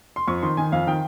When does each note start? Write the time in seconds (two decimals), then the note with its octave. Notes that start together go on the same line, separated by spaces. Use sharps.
0.16 C6
0.28 F2 C#6
0.43 D#3 C6
0.57 D#3 G#5
0.72 F2 F5
0.87 D#3 G5